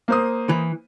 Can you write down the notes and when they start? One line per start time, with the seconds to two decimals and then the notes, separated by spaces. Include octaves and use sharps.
0.08 A#3 C5 D#6
0.49 E3